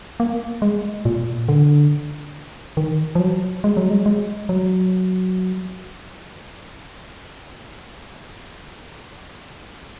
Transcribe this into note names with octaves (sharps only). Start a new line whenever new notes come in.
A#3
G#3
A#2
D3
D#3
F3
F#3
G#3
F#3
G#3
G#3
F#3